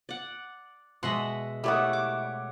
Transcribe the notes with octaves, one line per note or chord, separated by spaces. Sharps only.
D5 F#5
B2 G#3 D#5 E5 F#5 C6 B6
A3 E4 G4 C#5 D5 F#5 D#6
D6